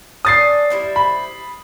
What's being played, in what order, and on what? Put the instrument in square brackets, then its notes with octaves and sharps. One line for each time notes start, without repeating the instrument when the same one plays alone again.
[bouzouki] C#4 D4 [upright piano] D#6 A6 C7
[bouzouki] G3 E4 C5
[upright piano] B5